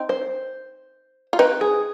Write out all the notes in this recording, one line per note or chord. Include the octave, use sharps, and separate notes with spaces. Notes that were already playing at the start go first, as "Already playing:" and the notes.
Already playing: C4 D#4
C5
F4
C4 D#4 B4
G#4